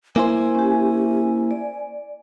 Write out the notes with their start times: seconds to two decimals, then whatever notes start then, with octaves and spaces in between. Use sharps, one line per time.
0.16 A#3 E4 C5 G#5
0.55 C#4 G4
1.51 D5